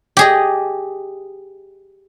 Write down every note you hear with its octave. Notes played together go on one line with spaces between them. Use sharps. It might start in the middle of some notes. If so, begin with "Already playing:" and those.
G4 G#4 D#5